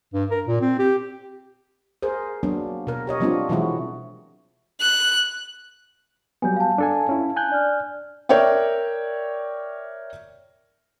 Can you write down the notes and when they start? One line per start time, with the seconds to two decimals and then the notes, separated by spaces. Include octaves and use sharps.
0.14 G2
0.31 A#4
0.47 A#2
0.61 C4
0.79 G4
2.03 G#4 A#4 C5
2.43 F#3 A#3 B3 D4
2.87 B2 A#4
3.07 G4 C#5 D#5
3.20 F3 G3 B3 C4 D4 F4
3.49 B2 E3 F#3 G#3 E4 F#4
4.81 F#6
6.42 F#3 G3 B3 G#5 G6
6.56 F5 A5
6.78 D4 A4 G#5
7.09 C#4 E4
7.36 G#5 F#6 G6
7.50 D4 D5 F6
8.29 A#4 C#5 D5 E5 G5